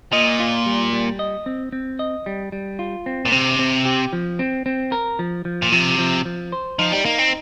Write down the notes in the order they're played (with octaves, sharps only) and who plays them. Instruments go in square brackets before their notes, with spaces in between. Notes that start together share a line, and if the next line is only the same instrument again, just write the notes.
[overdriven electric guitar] A#2 [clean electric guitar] D#5
[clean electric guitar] F4
G3
G3
D#5
C4
C4
D#5
G3
G3
F4
C4
[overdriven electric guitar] A#2
[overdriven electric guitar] C3 [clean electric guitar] C4
[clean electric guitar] C4
G4
F3
C4
C4
A#4
F3
F3
[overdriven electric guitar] A#2
[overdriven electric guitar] C3 [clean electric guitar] F3
[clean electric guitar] F3
F3
C5
[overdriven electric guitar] F3 [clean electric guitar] D#4
[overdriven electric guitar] G3
[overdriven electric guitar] A#3 [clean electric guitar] D#4
[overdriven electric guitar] C4